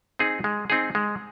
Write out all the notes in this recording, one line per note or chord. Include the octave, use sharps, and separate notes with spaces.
C4 D#4 G#4
G#3
C4 D#4 G#4
G#3